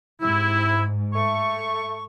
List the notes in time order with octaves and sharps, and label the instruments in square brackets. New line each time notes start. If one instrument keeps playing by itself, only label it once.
[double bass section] G#2 [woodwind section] C3 E4
[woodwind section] A3 C#6